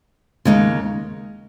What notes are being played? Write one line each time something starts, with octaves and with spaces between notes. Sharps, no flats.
D#2 C#3 G#3 D#4